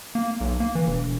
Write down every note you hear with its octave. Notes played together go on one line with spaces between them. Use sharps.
A#3
B1
A#3
E3
E1